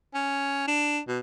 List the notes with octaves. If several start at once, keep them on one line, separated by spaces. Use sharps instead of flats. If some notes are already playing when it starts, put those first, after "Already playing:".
C#4
D4
B2